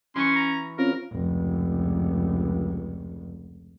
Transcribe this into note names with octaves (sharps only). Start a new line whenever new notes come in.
E3 C#4 C6 C#6
A#5
C4 C#4 F4 A#4
F1 C#2